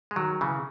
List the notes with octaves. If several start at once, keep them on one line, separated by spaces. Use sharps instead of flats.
G#3
D#3 F#3
C#3 E3